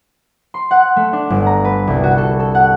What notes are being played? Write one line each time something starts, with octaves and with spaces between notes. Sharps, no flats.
C6
F#5
A3
D4
G1
A#5
B4
C2
F#4
A4
A4
F#5